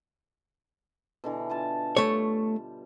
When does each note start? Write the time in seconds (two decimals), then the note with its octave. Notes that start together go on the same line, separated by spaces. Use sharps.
1.24 B2 D3 E3
1.50 F4 G#5 A5
1.97 G3 A3 C#5